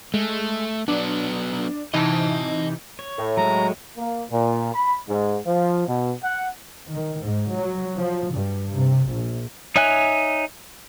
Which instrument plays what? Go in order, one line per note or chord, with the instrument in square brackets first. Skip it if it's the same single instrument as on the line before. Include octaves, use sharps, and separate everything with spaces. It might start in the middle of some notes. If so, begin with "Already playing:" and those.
[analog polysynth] G#3 [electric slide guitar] A3
[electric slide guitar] F#3 B3 [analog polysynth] D4
[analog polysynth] C3 E3 D#4 [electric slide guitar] D#5 A5
[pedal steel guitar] C#5
[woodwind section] A2
[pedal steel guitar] F#3 G#3 [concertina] A#5
[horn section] A#3
A#2
B5
G#2
F3
B2
F#5
[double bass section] D#3
G#2
F#3
F3
G2
C3
A#1
[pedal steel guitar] D#4 C#5 E5 G#5 F#6